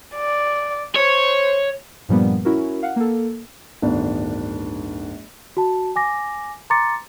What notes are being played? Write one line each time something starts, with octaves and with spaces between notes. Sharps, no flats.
D5
C5 C#5
G2 A#2 F3 G3 A#3 B3
C#4 E4 F#4 A#4
F5 F#5
A#3 A4
D1 G1 D#3 D4
F#4 A5
G#5 D6 A#6
A#5 C6 D6 A6 C#7